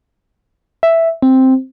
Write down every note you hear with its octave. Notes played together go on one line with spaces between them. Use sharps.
E5
C4